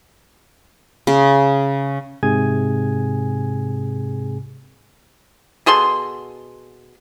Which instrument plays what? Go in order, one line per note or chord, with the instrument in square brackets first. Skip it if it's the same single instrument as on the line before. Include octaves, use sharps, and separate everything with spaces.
[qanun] C#3
[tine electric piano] G#2 C3 G#4 G#5 G#6
[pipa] B2 G#4 A4 C6